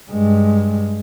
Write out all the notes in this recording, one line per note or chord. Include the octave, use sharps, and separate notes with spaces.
G2 G#3